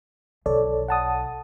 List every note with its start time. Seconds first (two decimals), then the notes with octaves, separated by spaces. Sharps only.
0.46 B1 A4 C#5 D5
0.88 F#5 A5 D#6